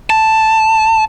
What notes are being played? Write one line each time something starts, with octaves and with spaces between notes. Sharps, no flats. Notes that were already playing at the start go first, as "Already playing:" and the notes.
A5